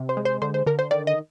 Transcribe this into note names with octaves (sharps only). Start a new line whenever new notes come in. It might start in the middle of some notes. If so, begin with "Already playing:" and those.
Already playing: C3
C5
G#3
C5
D3 C5
C5
D3 A#4
C5
D#3 D5
D#5